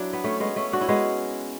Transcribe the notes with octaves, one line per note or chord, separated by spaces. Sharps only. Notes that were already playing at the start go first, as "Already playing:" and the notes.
Already playing: F#3 D4 E4
B3
A3 C#4
G#3 B3
A3 C#4
D4 F#4
C#4 E4
G#3 B3